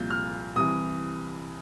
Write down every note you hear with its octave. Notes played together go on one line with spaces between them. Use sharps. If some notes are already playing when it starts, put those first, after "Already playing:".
Already playing: C2 A#2 F3 G6
F6
C2 C3 E3 D#6